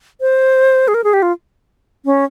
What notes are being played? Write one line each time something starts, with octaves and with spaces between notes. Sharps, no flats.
C5
G#4
A#4
G#4
G4
F4
C#4